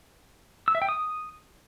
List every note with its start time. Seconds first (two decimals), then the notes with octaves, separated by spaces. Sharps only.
0.68 E6
0.75 E5
0.82 G5
0.89 D#6